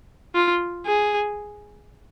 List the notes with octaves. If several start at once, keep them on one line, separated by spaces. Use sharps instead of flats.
F4
G#4